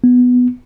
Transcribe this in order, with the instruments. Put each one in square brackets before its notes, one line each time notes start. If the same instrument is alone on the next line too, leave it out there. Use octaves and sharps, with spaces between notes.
[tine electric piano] B3